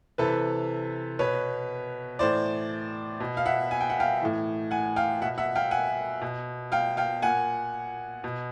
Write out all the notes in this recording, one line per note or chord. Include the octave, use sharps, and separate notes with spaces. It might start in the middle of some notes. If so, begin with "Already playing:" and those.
C3 E3 A4 B4
B2 B4 C#5
A2 E3 C5 D5
B2
F5
E5 F#5
G#5
G5
F#5
F5 G5
A2 E3
F#5 G#5
F5 G5
B2 E5 F#5
E5 F#5
F5 G5
F#5 G#5
B2
F5 G5
F5 G5
A#2 F#5 G#5
B2